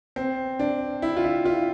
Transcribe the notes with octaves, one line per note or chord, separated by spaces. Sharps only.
C4
D4
E4
F4
E4
F4